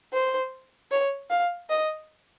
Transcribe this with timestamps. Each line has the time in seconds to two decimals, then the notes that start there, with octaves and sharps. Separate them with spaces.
0.13 C5
0.91 C#5
1.30 F5
1.69 D#5